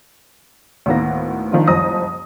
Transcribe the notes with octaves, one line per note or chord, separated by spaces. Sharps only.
D2 A2 D#3 A#3 B3 A#6
D#3 F3 D4 D#4 F4
F#1 C2 F3 A#5 D#6 A#6